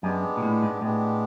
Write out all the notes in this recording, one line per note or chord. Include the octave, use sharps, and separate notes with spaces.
F#2 G#3 B3 D4 G4
A#2
A2
G#2
A2 G#3 B3 D4 G4